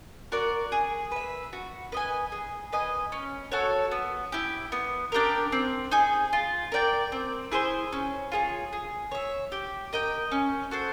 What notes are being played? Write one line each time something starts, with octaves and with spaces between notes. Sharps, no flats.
F#4 A#4 D5
G#4
B4 E5
F#4
B4 D#5 G#5
G#4
B4 D#5 G#5
C#4
F#4 A4 C#5
B3
E4 G4
B3
D4 G4 A#4
C4
D#4 G#4
F4
A#4 D5 G5
C4
E4 G#4 C5
C#4
F4 G#4 C#5
G#4
C#5 E5
G4
A#4 D#5 G5
C#4
F#4 A4 C5